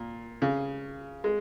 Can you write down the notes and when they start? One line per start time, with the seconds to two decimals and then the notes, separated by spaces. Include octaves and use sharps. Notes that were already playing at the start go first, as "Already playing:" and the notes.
Already playing: A#2
0.42 C#3
1.24 G#3